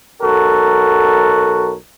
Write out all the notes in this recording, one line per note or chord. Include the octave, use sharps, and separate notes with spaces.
B1 F#4 A4 A#4